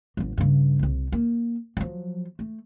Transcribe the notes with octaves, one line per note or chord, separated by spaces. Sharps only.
A1 F#3
G2 C#3
D#1 C2
A#3
F3 F#3
A3